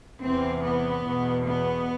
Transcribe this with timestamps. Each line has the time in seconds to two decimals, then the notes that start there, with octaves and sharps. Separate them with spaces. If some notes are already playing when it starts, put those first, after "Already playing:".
0.22 E2 C3 E3 C4
0.63 B3
1.04 E2 B2
1.46 B3